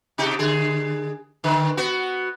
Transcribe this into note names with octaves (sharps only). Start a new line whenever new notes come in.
C3 D#4 G4
D3 G#4
D3 D#3 B4
B3 F#4